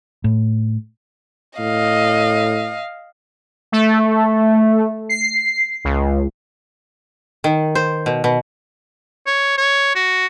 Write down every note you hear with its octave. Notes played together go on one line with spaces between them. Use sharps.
A2
A2 D#5 F5
A3
C7
C#2
D#3
C5
B2
B2
C#5
C#5
F#4